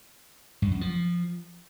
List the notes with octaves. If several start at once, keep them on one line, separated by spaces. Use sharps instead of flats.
G2
F#2
F3